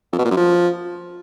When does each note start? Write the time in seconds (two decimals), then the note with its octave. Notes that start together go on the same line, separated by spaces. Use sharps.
0.12 F2
0.18 B2
0.24 A#2
0.30 F#2
0.37 F3